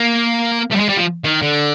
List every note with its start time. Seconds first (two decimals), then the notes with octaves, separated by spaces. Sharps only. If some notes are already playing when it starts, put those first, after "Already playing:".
Already playing: A#3
0.72 A3
0.76 G3
0.80 G#3
0.89 G3
0.98 F3
1.24 D#3
1.42 D3